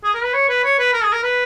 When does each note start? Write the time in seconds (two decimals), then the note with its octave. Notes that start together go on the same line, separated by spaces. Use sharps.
0.04 G#4
0.14 A#4
0.24 B4
0.33 C#5
0.49 B4
0.64 C#5
0.78 B4
0.93 A#4
1.04 G#4
1.12 A#4
1.23 B4